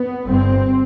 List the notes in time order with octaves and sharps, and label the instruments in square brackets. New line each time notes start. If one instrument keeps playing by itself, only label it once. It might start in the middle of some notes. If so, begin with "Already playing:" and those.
Already playing: [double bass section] B3
G1 G2 C4